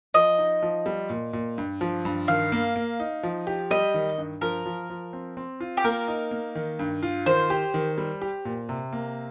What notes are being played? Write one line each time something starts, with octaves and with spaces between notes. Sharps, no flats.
F3 D#5
D#4
F3
G3
A#2
A#2
G2
F3
G2
D#3 F5
A#3
A#3
D#4
F3
G4
G3 D#5
D#3
G2
F3 A#4
F3
F3
C4
C4
F4
G4
A#3 A#4
D#4
A#3
D#3
G2
F4
D#3 C5
G4
D#3
G3
G4
A#2
C3
A#3